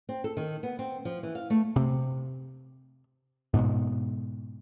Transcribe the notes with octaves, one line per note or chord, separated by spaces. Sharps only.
C4
A4
D#3
B3
C4
F3
E3
F5
A3
C3
G#2 B2